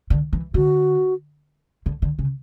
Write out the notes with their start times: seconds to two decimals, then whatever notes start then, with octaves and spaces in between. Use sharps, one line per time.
0.10 D3
0.33 E3
0.54 D3 F#4
1.86 D3
2.02 D3
2.19 C#3